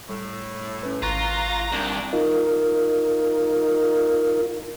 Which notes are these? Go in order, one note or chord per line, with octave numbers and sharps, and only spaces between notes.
A2 G3
C#4 B4
G#1 F4 A#5 C#6 F#6
C2 D#3 A#3 D4
D#4 F4 A#4